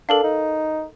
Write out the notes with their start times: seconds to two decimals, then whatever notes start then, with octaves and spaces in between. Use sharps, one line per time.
0.09 D4 A4 A#4 F5
0.24 D#4